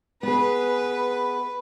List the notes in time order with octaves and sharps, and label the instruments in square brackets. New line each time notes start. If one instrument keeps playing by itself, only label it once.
[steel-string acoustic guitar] B3 G#4 [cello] B4